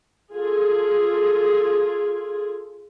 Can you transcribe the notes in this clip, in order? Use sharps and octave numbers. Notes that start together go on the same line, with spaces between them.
F4 G#4 A4